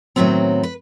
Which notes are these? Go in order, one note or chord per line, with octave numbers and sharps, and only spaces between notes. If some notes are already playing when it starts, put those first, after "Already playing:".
A2 D#3 F#3 B3 C4
B4